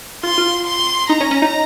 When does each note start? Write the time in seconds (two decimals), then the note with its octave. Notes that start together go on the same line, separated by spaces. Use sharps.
0.23 F4 C6
0.38 F4
0.66 C6
1.09 D#4 A#5
1.20 C#4
1.31 C#4
1.42 D#4